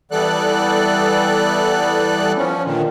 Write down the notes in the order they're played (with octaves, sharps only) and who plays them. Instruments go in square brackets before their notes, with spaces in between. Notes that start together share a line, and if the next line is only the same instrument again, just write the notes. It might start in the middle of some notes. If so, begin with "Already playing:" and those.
[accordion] E3 G3 B3 A4 D5 F#6
F3 C#4
A#2 D3 D#3